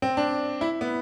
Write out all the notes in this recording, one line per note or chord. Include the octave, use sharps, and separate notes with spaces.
C4
D4
E4
B3